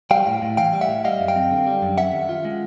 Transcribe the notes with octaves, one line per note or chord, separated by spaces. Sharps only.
G3 F5 G5
A2
A2
E3 F5 G5
G3
E5 F#5
A2
G3 D#5 F5
F#2
F5 G5
C4
D3
G3
F#2
C#4 E5 F#5
D#3
F4
G#3